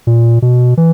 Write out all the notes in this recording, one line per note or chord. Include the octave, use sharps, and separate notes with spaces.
A#2
B2
E3